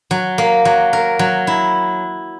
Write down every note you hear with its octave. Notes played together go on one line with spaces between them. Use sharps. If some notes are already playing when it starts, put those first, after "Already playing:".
F#3
A#3
F#3
A#4
F#3
E4